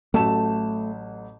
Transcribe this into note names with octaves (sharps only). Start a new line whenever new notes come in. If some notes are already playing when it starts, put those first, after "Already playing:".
A1 F#3 A3 A5 E7